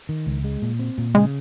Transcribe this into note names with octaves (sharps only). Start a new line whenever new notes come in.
D#3
C#2
G#3
A#2
C4
A#2
C#3 G#3